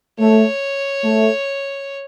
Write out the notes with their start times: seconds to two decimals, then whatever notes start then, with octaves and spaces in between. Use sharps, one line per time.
0.19 A3 C#5
1.03 A3